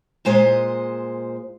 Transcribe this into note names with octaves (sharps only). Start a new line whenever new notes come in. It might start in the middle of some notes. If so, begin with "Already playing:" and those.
A#2 G#3 C5 D#5